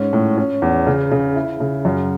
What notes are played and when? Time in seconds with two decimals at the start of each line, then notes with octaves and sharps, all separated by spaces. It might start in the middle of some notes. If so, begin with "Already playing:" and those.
Already playing: G#2 C#4
0.13 A2
0.38 C#4
0.62 E2
0.87 C#3
1.12 C#3
1.36 E4
1.60 C#3
1.85 F#2